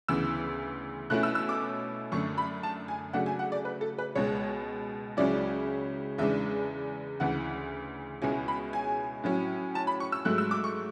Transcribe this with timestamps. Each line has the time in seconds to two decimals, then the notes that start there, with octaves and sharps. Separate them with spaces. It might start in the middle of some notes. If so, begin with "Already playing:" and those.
0.08 D2 C#3 E3 B3 E6
1.10 B2 A3 C#4 E4 F#6
1.23 E6
1.35 E6
1.49 D6
2.12 F#2 D3 A3 C#6
2.38 B5
2.63 A5
2.88 G#5
3.13 C#3 F#3 A3 D4 F#5
3.26 G#5
3.39 F#5
3.52 D5
3.65 B4
3.81 A4
3.98 B4
4.15 C#2 B2 G#3 C#5
5.17 C#2 C#3 F#3 C#4 E4 D5
6.18 E2 C#3 G#3 D4 E5
7.20 D2 C#3 E3 F#5
8.22 C#2 B2 G#3 C#4 E4 G#5
8.48 B5
8.73 G#5
9.24 A2 F#3 C#4
9.75 A5
9.87 B5
10.00 C#6
10.12 E6
10.25 G#2 F#3 A3 F#6
10.38 E6
10.51 D6
10.64 C#6